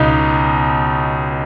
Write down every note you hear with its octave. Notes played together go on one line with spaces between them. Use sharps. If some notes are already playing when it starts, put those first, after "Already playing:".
Already playing: C#2 B2 D#4